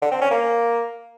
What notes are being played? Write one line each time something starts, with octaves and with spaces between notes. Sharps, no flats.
D3
C4
C#4
A#3